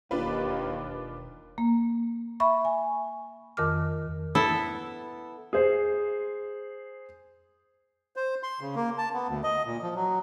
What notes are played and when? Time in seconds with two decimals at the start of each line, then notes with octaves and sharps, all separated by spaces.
0.11 E1 D#2 D4 F4 B4
1.58 A#3
2.40 E5 B5 C#6
2.65 G#5
3.57 F2 D#3 A#4 D6 F6
4.35 B3 E4 A4
5.53 G#4 C5
8.16 C5
8.43 C6
8.61 C#3
8.75 A#3
8.98 A5
9.14 B3
9.27 D2
9.44 D#5
9.65 A#2
9.82 F3
9.95 F#3